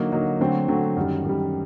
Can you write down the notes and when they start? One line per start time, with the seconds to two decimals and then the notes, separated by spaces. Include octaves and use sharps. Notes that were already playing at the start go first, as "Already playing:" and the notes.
Already playing: D3 F#3 A#3 D#4
0.12 D3 F#3 A#3 D#4
0.40 D3 F#3 A3 C4
0.68 D3 F#3 A3 C4
0.97 F#2 D#3 G3
1.24 F#2 D#3 G3